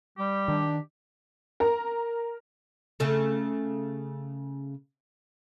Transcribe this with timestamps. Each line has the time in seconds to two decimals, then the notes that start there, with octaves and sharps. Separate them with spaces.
0.18 G3 G4
0.48 D#3 D4
1.60 A#4 A#5
3.00 C#3 A3